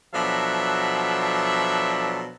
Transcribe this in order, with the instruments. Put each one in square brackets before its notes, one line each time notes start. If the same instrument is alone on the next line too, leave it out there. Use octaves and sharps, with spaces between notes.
[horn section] B2 F3 F#3 D4 A4 E5